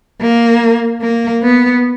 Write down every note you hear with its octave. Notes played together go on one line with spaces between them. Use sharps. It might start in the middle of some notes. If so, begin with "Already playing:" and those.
A#3
A#3
B3